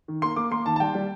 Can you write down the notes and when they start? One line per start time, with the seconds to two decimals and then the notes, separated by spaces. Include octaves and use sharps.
0.08 D#3
0.22 A#3 C6
0.36 A#3 D6
0.51 A#3 C6
0.66 D#3 A5
0.76 A5
0.80 G3 G5
0.95 G3